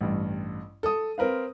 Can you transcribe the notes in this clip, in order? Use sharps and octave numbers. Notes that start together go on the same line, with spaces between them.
A1 G2
A4 D#6
C4 A#4 B4 F5